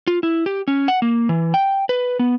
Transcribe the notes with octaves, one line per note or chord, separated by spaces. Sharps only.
F4
E4
G4
C#4
F#5
A#3
E3
G5
B4
B3